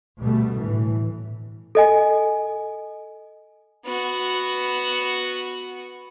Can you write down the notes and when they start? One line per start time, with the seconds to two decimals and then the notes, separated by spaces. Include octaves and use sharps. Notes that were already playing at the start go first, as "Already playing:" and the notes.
0.20 D2 B2 G3 A3
0.62 A2 E3
1.75 A4 D#5 G#5
3.85 B3 F#4